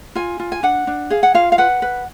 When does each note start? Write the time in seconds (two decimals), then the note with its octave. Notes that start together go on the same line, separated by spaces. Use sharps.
0.15 F4 G#5
0.40 F4
0.52 G#5
0.63 D4 F#5
0.87 D4
1.10 G#4 F5
1.23 F#5
1.34 F4 F5
1.52 F5
1.58 B4 F#5
1.82 B4